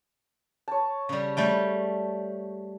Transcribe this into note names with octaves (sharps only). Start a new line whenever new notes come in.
C#5 A5
C#3 G3
G3 A3 G5